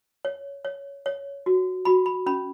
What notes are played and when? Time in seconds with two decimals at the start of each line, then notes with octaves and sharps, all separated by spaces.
0.25 C#5
0.64 C#5
1.06 C#5
1.46 F#4
1.85 F#4 B5
2.06 B5
2.26 C#4 B5